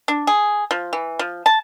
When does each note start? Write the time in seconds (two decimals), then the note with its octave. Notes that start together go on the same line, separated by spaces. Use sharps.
0.08 D4
0.27 G#4
0.71 F3
0.93 E3
1.19 F3
1.46 A5